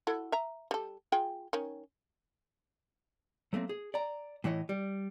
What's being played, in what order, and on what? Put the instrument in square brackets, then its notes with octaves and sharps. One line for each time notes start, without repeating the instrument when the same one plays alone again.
[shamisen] E4 F#4 A4
E5 A#5
G3 A4
F4 G#4 G5
D#3 C#4
[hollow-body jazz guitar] F#3 A3 A#3 C4
G#4
D5 A#5
A2 E3 E4 C#5 D#5
G3